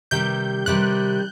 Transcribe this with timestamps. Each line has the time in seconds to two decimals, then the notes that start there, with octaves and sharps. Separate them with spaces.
0.11 C3 D#3 G3 G6
0.66 C3 D#3 G3 F#6